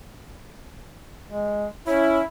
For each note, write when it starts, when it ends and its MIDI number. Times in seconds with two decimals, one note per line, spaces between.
1.30 1.66 56
1.87 2.21 61
1.87 2.22 64
1.87 2.18 73